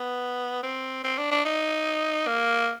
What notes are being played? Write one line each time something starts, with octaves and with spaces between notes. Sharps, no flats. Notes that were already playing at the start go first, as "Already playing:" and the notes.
Already playing: B3
C4
C4
D4
D4
D#4
A#3